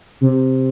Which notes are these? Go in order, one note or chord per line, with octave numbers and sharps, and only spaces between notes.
C3